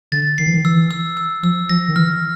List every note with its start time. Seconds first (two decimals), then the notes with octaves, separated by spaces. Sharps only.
0.12 D3 A6
0.38 D#3 C7
0.46 E3
0.54 D#3
0.64 E3 E6
0.91 E6
1.17 E6
1.43 F3 E6
1.69 F3 A#6
1.88 D#3
1.96 E3 F6